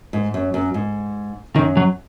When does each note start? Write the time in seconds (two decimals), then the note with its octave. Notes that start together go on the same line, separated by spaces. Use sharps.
0.13 G#2
0.34 F#2
0.54 F#2
0.74 G#2
1.55 F#2 D#3
1.77 F#3